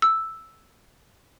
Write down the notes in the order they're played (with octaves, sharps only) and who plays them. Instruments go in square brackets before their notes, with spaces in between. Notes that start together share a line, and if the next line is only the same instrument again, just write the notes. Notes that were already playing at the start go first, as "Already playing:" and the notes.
[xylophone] E6